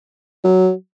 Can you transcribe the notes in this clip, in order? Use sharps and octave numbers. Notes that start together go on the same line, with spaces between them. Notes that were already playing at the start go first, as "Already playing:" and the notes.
F#3